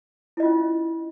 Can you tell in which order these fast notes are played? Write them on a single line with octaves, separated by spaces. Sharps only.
E4 D#5 F4 C#4